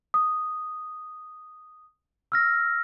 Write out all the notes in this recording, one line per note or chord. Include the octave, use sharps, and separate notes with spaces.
D#6
E6 F6 A#6